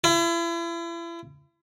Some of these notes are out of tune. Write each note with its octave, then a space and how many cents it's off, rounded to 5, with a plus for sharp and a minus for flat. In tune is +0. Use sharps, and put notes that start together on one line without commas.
E4 +40